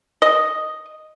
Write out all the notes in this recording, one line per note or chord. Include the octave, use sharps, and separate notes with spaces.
D#5